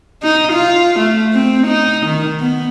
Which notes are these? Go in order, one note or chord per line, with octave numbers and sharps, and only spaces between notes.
D#4
F4
A3
C4
D#4
D#3
B3